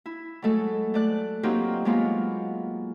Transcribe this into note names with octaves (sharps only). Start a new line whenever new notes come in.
E4
F#3 G#3 A3 A4
A3 D5 F#6
F#3 A#3 C4 D#4 F4 G4
F#3 G#3 A#3 B3 F4